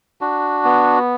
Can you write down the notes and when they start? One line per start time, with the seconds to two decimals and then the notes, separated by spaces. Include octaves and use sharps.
0.21 D4 F#4
0.65 B3